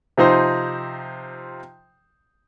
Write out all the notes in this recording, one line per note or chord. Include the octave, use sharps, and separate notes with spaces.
C3 F3 D#4 C5